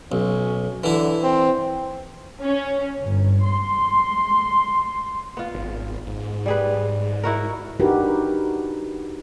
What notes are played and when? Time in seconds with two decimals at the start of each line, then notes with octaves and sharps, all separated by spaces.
0.12 B1 C#4
0.84 D3 E3 E4
1.23 C4
2.42 C#4
2.99 G1
3.41 C6
5.37 B3 F4
5.55 G#1
6.06 G#2
6.46 G3 G#4 B4
7.23 E4 F#4 A#4
7.80 D4 D#4 F#4 G4 A#4 B4